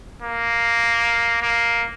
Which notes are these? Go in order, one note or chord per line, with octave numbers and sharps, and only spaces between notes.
A#3
A#3